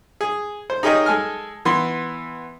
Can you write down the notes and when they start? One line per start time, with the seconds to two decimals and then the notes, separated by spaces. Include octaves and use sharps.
0.21 G#4
0.70 C5
0.83 D#4 G4 G#4 A#4 C#5 D#5
1.06 G#3 A4 G#5 F6
1.65 E3 B3 C6